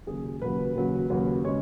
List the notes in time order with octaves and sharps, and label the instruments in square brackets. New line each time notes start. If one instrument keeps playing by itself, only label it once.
[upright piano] D#2 C#3 F#3 G#4
D#2 C#3 F#3 B4
D#2 C#3 F#3
D#2 C#3 F#3
C#3 G#3 C#5